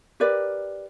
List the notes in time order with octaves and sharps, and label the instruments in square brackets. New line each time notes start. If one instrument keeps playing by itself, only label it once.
[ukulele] G4 A#4 B4 D5